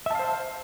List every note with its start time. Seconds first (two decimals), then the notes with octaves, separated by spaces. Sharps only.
0.06 E5
0.11 A5
0.15 F5
0.19 C5